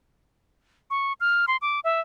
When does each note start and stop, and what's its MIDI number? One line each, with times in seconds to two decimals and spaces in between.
0.90 1.13 85
1.20 1.46 89
1.48 1.57 84
1.62 1.80 86
1.84 2.00 76